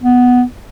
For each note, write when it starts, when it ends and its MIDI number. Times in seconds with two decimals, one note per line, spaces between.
0.03 0.43 59